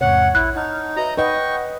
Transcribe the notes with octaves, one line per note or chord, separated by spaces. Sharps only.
E2 G#2 C3 C#5 F#5
A#1 E4 F#6
D#4 F#5 A5 F6
F#4 B4 D#5 E5 A#5
D#4 B4 D#5 F#5 G5 C#6